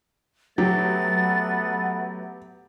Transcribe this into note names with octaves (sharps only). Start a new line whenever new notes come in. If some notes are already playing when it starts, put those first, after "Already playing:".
F#3 A3 B3 G4 A6